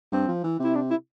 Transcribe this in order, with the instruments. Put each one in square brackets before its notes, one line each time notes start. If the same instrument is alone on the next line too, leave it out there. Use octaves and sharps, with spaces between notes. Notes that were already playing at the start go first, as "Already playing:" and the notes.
[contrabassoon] G2 [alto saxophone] C4
[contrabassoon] F3
E3
[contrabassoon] C3 [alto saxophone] E4
[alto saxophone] D4
E4